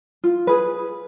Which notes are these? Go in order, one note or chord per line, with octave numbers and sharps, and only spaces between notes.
F4
G#4 B4